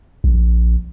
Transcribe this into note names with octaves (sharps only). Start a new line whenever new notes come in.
A#1